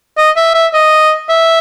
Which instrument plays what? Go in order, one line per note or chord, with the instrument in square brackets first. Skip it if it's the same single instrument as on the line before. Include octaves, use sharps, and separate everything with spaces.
[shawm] D#5
E5
E5
D#5
E5